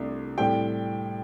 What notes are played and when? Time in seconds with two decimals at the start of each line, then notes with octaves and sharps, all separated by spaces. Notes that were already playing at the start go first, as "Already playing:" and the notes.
Already playing: C2 C3 A3 D4
0.38 A2 G3 C4 G5